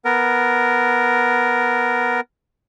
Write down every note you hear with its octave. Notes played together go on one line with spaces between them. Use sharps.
B3 A#4